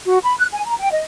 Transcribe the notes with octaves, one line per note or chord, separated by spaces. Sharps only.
F#4
B5
F#6
G#5
A#5
G5
D#5